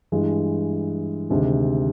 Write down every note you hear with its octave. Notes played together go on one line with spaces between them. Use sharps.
G2 E3 G#3
D2 C3 D#3 G#3